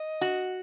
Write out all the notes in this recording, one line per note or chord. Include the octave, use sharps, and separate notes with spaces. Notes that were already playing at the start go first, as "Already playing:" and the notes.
Already playing: D#5
F#4